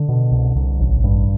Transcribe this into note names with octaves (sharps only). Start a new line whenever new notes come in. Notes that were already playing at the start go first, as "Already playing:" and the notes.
Already playing: D3
B2
C2
C2
A1
G2